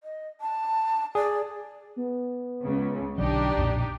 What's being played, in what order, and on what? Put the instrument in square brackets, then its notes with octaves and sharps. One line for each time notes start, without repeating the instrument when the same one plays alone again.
[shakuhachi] D#5
A5
[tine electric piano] G#4 [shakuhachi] D5
[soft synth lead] B3
[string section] C#2 C#3
[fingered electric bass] B1 D3 F#3 [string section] D4 D#4 G4 [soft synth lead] D5
[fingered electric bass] B1 F2 A#2